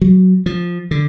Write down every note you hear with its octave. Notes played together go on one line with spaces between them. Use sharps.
F#3
F3
D3